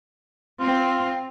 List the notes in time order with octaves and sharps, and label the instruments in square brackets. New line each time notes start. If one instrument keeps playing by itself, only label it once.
[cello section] C4 [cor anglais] F4